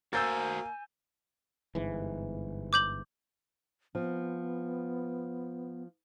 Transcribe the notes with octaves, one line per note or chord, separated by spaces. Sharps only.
A#3 F#4 C5 G#5 E6 G6 A6
G1 G#2 E3
D6 G6 F#7
F3 B3 C4